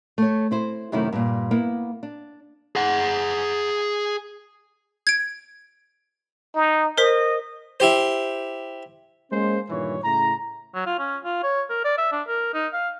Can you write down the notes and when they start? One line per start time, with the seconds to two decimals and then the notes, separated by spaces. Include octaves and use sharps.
0.18 A3 C#5
0.51 C4 E4 C5
0.92 F#2 C3 D#3 A3 E4
1.13 G2 A#2
1.51 A#3 B3 E4
2.03 D4
2.76 G#4 F#5
5.07 G#6 D7
6.55 D#4
6.98 A#4 C5 D#5 B6
7.80 E4 G4 C5
9.32 G#3 A#3 C#4 C5
9.69 G2 A#2 D#3 E3 C#5
10.04 A2 C#3 E4 A#5
10.75 F#3
10.86 F4
10.99 C#4
11.25 F4
11.43 C#5
11.70 A#4
11.84 D5
11.98 E5
12.12 D4
12.28 A#4
12.54 D#4
12.73 F5